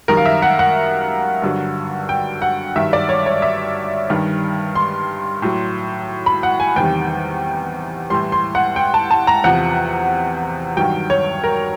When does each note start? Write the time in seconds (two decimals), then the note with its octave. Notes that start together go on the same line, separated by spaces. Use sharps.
0.08 F#2 D#3 G3 A#4
0.17 F5
0.26 E5
0.42 F#5
0.59 F#5
1.42 G2 D3 F#3
2.09 G5
2.42 F#5
2.76 G2 D#3 F#3 E5
2.93 D5
3.09 C#5
3.26 C#5
3.42 E5
4.09 G2 D#3 G3
4.75 C6
5.42 A2 F#3
6.26 B5
6.43 F#5
6.60 G#5
6.76 E2 C3 D#3 G3 G5
8.10 A2 E3 G3 C6
8.32 C6
8.55 F#5
8.76 G5
8.94 A5
9.11 A5
9.27 A#5
9.44 E2 C3 F3 F#5
10.77 G2 D#3 F#3 G5
11.10 C#5
11.44 A#4